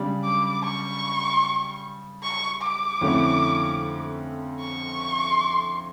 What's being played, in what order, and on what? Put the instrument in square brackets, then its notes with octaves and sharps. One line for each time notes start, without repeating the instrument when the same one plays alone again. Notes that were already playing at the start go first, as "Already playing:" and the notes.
Already playing: [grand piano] C#3 G3 D4
[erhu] D6
C#6
C#6
D6
[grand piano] F2 D3 A3 C#4 E4
[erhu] C#6